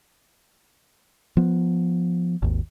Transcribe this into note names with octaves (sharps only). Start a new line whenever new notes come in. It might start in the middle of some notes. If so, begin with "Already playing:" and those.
F3 B3
G#1 D#2